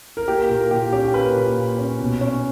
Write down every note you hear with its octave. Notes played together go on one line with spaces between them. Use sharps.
A#4
A#3 G4
A#2 A#4
A#2 G4
C#4 G4
A#3 B4
A#2
A#2
C#4
B2
C#4